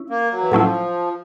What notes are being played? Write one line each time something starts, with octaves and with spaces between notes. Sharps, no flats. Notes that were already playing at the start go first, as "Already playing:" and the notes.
Already playing: C#4 E4
A#3
F#3
E3
A2 F3 F#3 A3 C#4 E4